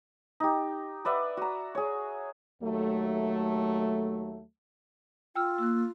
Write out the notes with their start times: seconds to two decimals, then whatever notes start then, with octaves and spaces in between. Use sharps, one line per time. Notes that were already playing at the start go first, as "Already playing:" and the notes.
0.40 D#4 G4
1.05 B4 D5 E5 F#5
1.37 F#4 A#5
1.75 G#4 C#5
2.63 D#2 F#3 A3
5.35 F4 G5 E6 F6
5.58 A#3 E6 F#6